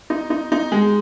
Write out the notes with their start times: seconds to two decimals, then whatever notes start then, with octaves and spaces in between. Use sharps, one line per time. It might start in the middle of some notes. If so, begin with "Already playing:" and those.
0.10 D#4
0.30 D#4
0.52 D#4
0.72 G#3